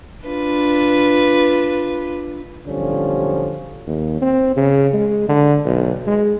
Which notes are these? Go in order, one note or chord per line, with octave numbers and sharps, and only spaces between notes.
D4 F4 B4
B1 A2 D3 F3 G3 C#4
D#2
C4
C#3
G#3
D3
B1
G#3